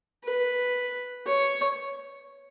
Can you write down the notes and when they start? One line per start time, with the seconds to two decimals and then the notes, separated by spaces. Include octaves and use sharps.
0.24 B4
1.27 C#5